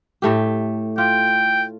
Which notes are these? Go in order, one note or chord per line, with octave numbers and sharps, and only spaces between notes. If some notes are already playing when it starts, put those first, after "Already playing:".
A2 A3 G4
F4 G5